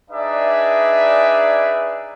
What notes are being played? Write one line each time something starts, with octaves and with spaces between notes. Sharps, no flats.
D4 D#4 G#4 B4 D5 E5